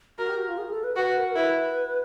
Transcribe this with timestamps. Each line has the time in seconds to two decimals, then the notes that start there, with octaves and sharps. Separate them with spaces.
0.18 F#4 A#4
0.28 G4
0.37 F#4
0.48 F4
0.58 G#4
0.71 A4
0.84 B4
0.96 F#4 B4
1.17 A#4
1.30 A#4
1.36 E4 B4